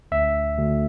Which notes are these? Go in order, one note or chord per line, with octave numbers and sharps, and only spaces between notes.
D2 E5
D2